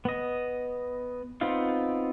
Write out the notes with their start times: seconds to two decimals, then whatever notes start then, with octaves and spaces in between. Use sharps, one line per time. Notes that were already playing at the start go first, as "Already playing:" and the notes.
0.05 B3 D#5
1.41 B3 C4 D#4 F4 F5